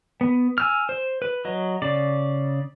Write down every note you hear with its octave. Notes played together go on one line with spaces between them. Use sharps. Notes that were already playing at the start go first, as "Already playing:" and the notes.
B3
G#5 E6 F6
C5
B4
F#3 D#5
C#3 D5